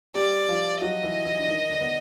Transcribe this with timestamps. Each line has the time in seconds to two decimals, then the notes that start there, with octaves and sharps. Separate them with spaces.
0.15 G3 G4 D5
0.48 F3 F4
0.81 F#3 F#4 D#5
1.03 E3 E4
1.25 E3 E4
1.38 D4
1.47 D#3 D#4
1.69 D3 D4
1.81 B3